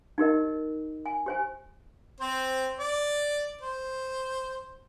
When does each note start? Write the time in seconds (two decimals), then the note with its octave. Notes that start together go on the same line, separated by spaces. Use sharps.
0.18 D#4 G4 A#4 D#5
1.06 G#5
1.26 G4 C5 G#5
2.20 C4 C5
2.79 D5
3.61 C5